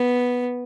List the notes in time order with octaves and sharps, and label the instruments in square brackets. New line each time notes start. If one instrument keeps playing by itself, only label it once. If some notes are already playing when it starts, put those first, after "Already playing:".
Already playing: [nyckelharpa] B3